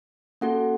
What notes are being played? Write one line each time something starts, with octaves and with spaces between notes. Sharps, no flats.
A#3 C#4 F#4 A4 F#5